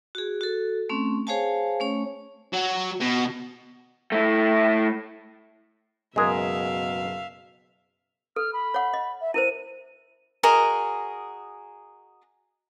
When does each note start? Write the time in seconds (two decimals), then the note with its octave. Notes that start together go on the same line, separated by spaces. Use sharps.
0.15 F#4 G#4
0.41 F#4 A4
0.89 A3 C4 C#4
1.27 G#4 C5 C#5 F5 G#5 A5
1.80 A3 C#4 C#5
2.53 F#3
3.00 B2
4.12 A3 E4
6.16 F#1 B2 G#3 G#4 A#4 E5 F5
8.36 A4 F6
8.53 B5
8.74 C#5 F#5
8.94 D#5
9.21 E5
9.34 E4 A#4 C5 D#7
10.43 F#4 G#4 A#4 D#5